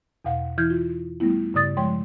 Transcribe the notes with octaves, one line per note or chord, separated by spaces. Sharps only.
E2 B2 F5 F#5
E3 E4 F6 G6 G#6
F4
G3 A3 B3 E4
G2 C#3 D5 D#6 A6
F3 G#3 C#5 G5 C6